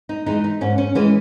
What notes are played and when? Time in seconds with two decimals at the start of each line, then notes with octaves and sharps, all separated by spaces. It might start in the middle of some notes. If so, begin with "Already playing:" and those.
0.09 D#4
0.26 E3 G#3 D#4
0.44 D#4
0.61 G#2 C#4
0.78 C#4
0.95 E3 G#3 C#4